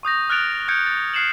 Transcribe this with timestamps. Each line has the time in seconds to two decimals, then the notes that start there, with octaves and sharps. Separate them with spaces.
0.03 C#6 D#6 G6 A#6
0.30 F6 F#6 A6 D7 F7
0.68 F6 G6 G#6 C#7 D7
0.86 A6
1.14 F6 F#6 C7 C#7 E7 F#7